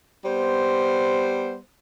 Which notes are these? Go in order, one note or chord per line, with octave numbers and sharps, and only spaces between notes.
G3 B3 C5